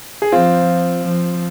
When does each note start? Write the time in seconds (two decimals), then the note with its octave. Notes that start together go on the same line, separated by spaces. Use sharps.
0.22 G#4
0.32 F3 C4 F4
1.02 F3